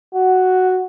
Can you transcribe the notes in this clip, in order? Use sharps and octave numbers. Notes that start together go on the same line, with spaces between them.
F#4